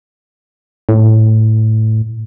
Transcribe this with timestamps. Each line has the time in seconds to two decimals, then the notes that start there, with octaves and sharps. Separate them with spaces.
0.89 A2